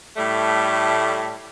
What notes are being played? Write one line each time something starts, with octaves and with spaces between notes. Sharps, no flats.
A2 G3 A3